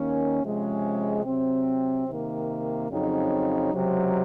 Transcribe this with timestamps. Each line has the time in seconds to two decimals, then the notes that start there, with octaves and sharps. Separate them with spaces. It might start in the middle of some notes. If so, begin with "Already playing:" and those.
Already playing: D#2 D#3 A#3 C#4
0.42 C3 F3 G#3 C#4
1.25 C3 F#3 C4
2.07 C3 D#3 A#3
2.88 F2 C#3 F#3 C4 D#4
3.72 C#2 C3 F#3 C4